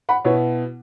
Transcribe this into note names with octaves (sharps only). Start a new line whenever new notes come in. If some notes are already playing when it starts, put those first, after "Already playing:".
F#5 B5
B2 B3 E4 C#5